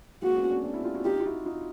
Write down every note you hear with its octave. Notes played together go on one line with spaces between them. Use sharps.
G#3 A#3 F#4
B3 C#4
C4 D4
C4 D4
E4 F#4
F4 G4
E4 F#4
D#4 F4 G4
F4
E4 F#4
D#4 F4